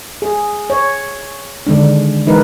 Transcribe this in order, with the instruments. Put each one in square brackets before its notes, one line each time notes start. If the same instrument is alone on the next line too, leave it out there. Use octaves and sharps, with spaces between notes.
[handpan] G#4
C#5
D3 D#3 G#3 D4
E3 G#3 D#4 A#4 B4